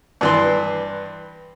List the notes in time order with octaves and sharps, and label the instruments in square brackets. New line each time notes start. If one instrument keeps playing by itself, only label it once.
[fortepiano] G2 E3 C6